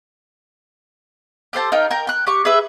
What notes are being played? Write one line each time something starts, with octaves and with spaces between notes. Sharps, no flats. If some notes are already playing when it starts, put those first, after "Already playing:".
G4 A4 C5 A5
D#4 F4 A#4 G5
A#4 G5 G6
G5 F#6
G4 C#6
G#4 B4 E5